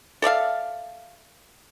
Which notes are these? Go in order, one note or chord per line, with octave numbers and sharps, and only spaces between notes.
A4 D5 E5 F5